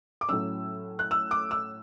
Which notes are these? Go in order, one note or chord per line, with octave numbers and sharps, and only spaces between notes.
D6
A2 F#3 C#4 E6
F#6
E6
D6
E6